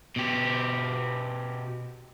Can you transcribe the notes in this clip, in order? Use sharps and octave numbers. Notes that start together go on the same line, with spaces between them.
B2 G4